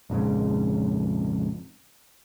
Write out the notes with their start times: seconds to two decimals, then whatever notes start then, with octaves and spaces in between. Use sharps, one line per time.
0.10 A#1 F2 G#2 C#3